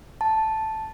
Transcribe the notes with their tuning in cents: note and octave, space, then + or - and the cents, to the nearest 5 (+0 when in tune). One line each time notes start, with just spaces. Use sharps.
A5 +0